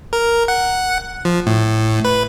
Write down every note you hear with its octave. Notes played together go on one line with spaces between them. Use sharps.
A#4
F#5
F3
A2
B4